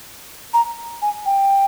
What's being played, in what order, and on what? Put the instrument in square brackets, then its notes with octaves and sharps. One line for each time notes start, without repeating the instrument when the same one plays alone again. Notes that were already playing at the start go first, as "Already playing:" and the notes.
[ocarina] A#5
G#5
G5